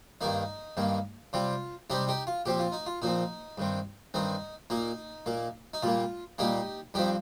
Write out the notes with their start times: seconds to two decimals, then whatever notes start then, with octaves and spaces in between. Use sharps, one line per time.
0.21 G2 D#3 A#3 D#4
0.77 G2 D#3 A#3
1.33 C3 G3 C4 F4
1.90 C3 G3 C4 D#4 G4
2.08 D#4 G4
2.27 F4
2.46 A#2 F3 C4 G4
2.59 F4
2.72 D#4
2.86 F4
3.02 A#2 F3 C4 D#4
3.58 G2 D#3 C4
4.14 G2 D#3 C4 D#4
4.70 A#2 A#3 D#4
5.26 A#2 A#3
5.74 D#4
5.82 A#2 G3 A#3 F4
6.38 A#2 G3 A#3 D#4 G4
6.94 G2 F3 C4 D#4 G4